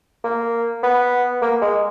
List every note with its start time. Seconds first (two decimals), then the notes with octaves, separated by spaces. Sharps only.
0.24 A#3
0.83 B3
1.42 A#3
1.62 G#3